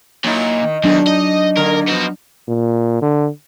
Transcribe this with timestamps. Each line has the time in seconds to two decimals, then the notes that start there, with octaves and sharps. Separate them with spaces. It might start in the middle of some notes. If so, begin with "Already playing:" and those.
0.24 A#2 F#3 D#4 E4
0.62 D#3
0.84 E2 B2 D#3 F#3 D4 G#4
1.07 D#4 D#5
1.57 D3 A#3 A#4
1.88 F3 B3 D#4 F#4
2.48 A#2
3.02 D3